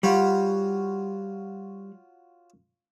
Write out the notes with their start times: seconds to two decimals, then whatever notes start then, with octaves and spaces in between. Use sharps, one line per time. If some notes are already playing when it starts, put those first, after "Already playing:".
0.03 G3 F4 F#4 C#5